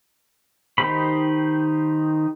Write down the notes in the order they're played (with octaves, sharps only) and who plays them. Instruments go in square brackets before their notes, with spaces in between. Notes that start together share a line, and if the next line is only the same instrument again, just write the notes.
[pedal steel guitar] D#3 D#4 G4 C5 B5